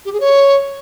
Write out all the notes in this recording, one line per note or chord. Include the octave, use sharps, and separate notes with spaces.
G4
G#4
C#5